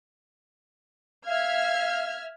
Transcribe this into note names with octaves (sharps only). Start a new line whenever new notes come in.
E5 F5 F6 G#6